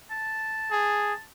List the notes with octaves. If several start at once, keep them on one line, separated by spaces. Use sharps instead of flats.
A5
G#4